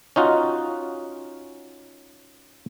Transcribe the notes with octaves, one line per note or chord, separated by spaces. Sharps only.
C#4 D#4 F4 F#4